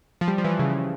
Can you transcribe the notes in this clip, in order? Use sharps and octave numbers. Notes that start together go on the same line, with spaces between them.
F3
G3
F3
E3
F3
C#3
C#3